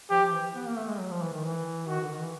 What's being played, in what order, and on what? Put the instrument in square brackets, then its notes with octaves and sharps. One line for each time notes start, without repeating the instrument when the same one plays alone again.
[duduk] F3 [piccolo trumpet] G4
[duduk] F3
E3
B3
A#3
A3
G#3
F#3
F3
E3
D#3
E3
[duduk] D#3 [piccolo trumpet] F#4
[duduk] D3
D#3
E3